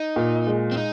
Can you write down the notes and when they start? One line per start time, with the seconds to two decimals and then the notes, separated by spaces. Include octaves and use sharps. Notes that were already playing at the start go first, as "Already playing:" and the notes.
Already playing: D#4
0.16 A#2
0.47 G#3
0.71 C4
0.77 D#4